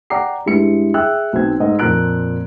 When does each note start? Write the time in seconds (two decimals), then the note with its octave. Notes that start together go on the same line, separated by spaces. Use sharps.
0.10 D5 F#5 G5 A#5 D6 C7
0.46 G2 G#3 E4 C#7
0.94 G#4 E5 G5 E6 F#6
1.33 B1 C4 G#6
1.60 G#2 D#5
1.79 F2 A#2 A#4 A#5 F#6 D7